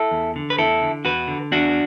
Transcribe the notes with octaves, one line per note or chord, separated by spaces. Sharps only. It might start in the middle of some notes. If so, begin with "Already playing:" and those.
Already playing: E4 A4
E2
D3
B4
E2 E4 A4
D3
E2 F#4 B4
D3
E2 D4 F#4